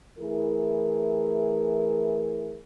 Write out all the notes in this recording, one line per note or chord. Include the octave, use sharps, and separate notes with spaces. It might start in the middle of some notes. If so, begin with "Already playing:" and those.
E3 A3 E4 G#4 A#4